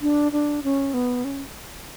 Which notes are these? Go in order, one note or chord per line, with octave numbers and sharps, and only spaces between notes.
D4
D4
C#4
B3
C#4